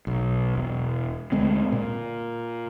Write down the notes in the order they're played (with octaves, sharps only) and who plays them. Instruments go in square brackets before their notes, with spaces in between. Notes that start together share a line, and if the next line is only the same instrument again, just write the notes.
[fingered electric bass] B1
E1
D2 G#3 C4
A#2